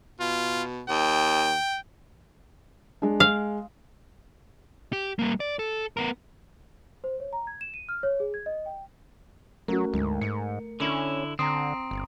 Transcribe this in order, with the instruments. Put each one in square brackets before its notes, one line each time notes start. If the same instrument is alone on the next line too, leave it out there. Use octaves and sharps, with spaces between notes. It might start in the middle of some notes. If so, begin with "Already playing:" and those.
[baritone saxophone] B2 [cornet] F4
[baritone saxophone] D#2 [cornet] G5
[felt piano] G#3 D4
[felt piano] G#3 [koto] F5
[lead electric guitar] G4
G3 A#3
D5
A4
B3 A#4
[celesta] C5
C#5
A#5
G#6
E7
D#7
F6
C#5
G#4
G#6
D#5
G5
[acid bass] F#3 [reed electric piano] A3 A#4 [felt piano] C#4 F#4
[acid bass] D2 [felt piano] G#2
[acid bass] G#2 [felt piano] C#7
[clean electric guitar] D3 E4 [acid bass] C#4
[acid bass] D3 [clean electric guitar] C4 [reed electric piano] A#5 C6 D#6
[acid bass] G1